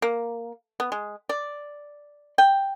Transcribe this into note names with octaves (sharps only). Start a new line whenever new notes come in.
A#3
B3
G#3
D5
G5